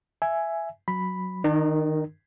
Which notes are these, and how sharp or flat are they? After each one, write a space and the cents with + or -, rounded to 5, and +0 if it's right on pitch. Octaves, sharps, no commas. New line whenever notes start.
E5 +10 G#5 +5
F#3 -5 B5 +0
D#3 +0 D4 +45 A#4 +0